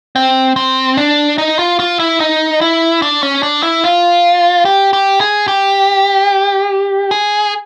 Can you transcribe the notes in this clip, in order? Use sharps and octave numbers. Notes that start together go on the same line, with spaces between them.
C4
C4
D4
D#4
F4
F4
E4
D#4
E4
D4
C#4
D4
E4
F4
G4
G4
G#4
G4
G#4